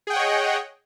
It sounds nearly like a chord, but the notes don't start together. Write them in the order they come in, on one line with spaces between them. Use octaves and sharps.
G#4 G5 F#5 C#5 D#5